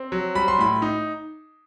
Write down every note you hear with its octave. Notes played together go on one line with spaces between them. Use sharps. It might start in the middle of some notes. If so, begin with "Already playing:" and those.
Already playing: C4
F#3
G3 B5
C6
A2 B5
D#4